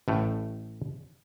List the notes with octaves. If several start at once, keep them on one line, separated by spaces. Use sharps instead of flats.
A1 A2 A3